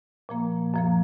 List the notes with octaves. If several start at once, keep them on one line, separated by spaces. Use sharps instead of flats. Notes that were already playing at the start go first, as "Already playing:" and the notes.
A#2 F3 A#3
F#2 F3 A#3